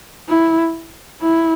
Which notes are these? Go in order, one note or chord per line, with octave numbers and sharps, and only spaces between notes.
E4
E4